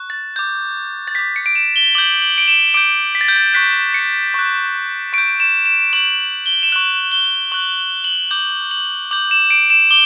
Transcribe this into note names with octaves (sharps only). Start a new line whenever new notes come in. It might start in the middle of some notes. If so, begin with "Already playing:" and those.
Already playing: C#6 F#6
A6
D6 G6
A6
D6 G6 B6
C#7
D7
E7
G7
D6 G6 F#7
F#7
D7
E7
D6 G6 D7
B6
A6
G6
A6
C#6 F#6 B6
C#7
C#6 F#6
C#6 D7
G6
E7
E7
C#6 G6 F#7
G7
E7
C#6 F#6 F#7
G7
C#6 F#6 F#7
F#7
D6 G6 F#7
F#7
D6 G6 F#7
E7
D7
E7
D6 G7